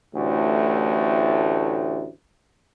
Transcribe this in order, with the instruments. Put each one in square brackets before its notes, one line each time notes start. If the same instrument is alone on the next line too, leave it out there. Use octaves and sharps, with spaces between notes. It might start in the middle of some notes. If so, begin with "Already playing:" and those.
[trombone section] A1 D2 A2